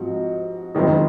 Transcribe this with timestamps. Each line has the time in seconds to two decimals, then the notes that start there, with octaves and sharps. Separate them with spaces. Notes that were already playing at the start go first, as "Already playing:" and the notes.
Already playing: G#2 F3 C4 F#4
0.75 F#1 F2 D#3 G#3 D#4